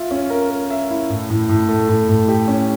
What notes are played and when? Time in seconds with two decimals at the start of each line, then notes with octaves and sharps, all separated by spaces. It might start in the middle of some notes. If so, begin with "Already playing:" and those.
Already playing: F4 E5
0.11 C#4
0.30 A#4
0.51 A#4
0.70 E5
0.90 E4
1.10 A2
1.30 A2
1.49 A2
1.69 A3
1.89 A2
2.08 A2
2.28 G4
2.48 C#4